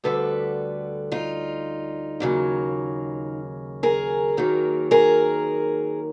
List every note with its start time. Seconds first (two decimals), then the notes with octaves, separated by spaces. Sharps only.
0.04 D2 D3 G3 A4 B4
1.12 D#4 F4
2.20 D#2 C#3 F#3 A#3
3.83 G#4 A#4
4.37 D#2 D#3 F#3 A#3
4.91 G#4 A#4